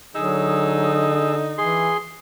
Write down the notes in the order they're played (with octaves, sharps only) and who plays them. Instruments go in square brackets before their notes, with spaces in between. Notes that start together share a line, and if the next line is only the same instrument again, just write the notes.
[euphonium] D3 [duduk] F#3 [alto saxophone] D#4 [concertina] G#4 E6
[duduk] E3 [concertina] G#4 C6